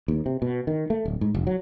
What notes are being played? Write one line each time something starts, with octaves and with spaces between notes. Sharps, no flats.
D#2
C3
B2
D#3
A3
D1
G#2
F1
F#3